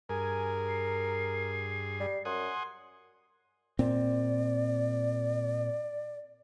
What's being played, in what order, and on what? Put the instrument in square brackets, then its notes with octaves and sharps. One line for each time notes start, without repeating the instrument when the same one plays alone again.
[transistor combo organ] G2 G#4 [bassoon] A#4 [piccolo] G#5
[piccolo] C7
[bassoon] G3
[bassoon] F#2 [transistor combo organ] F#5 G#5 D#6 [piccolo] C6
[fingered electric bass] A#2 C4 [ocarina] D5